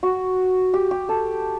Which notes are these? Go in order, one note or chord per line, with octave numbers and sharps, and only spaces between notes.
F#4
G4
G4
A4